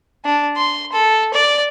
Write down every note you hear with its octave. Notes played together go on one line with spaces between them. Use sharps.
D4
C6
A4
D5